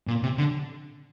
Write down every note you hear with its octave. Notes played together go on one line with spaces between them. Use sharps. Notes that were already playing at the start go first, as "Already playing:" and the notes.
A#2
C3
D3